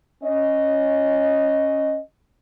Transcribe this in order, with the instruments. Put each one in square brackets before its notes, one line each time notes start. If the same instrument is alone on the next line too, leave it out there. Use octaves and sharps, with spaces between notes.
[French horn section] C#4 D#5